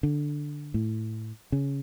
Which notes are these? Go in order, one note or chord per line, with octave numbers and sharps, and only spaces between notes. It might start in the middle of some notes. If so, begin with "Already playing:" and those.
D3
A2
C#3